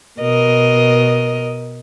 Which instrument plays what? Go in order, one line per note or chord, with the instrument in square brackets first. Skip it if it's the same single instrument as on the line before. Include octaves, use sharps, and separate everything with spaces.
[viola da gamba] B2 A#4 D#5